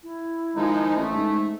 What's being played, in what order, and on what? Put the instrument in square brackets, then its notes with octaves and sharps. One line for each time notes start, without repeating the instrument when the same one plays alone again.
[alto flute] E4
[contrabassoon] D#3 [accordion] F3 G#3 D#4
[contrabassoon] A1 [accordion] A3
[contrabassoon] G#2